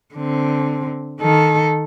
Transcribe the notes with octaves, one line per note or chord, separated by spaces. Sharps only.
D3 C4
D#3 A4